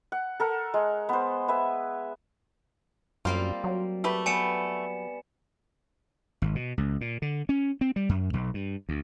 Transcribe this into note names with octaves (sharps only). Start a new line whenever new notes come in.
F#5
A4 A#4 F#5
G#3
B3 C5
B4 E5 G#5
F#2 G3 A#3 C4 F4
F#3
A3 G4 B4
G3 B3 G#5 C#7 E7
G#1
B2
C#2
A#2
D3
C#4
C4
G3
F#2
B1
G2
D2